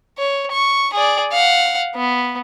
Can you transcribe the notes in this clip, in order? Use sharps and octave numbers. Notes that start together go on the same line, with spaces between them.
C#5
C#6
G#4 D5
F5 F#5
B3